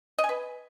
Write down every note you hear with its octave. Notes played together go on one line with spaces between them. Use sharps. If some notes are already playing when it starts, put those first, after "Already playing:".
D#5
G#5
B4